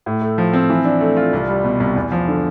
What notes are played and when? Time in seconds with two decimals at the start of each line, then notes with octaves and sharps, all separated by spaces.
0.06 A2
0.22 A3
0.38 F3
0.53 C4
0.70 E3
0.85 D4
1.01 A3
1.17 F4
1.33 C2
1.48 G3
1.64 B2
1.80 C2
1.96 E2
2.12 F3
2.28 D3